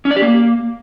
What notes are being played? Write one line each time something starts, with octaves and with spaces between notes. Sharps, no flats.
C#4
D5
G4
A#3